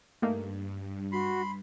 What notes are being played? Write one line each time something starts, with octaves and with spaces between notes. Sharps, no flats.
G2 A3 A#3 D#4
F#4 B5 C6